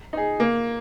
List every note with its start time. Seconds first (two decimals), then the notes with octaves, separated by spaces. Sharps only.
0.13 D#4 G#4
0.40 A#3